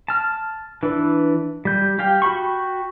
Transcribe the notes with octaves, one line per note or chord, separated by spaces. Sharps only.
A5 F6
E3 D4 B4
G3 G6
G4 F5 G5
F#4 G5 B5 C#6